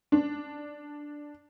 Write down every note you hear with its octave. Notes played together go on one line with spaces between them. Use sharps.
D4